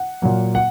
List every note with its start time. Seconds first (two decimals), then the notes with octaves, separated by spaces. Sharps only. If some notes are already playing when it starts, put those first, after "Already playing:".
Already playing: F#5
0.22 A#2 F#3 A#3
0.55 F#5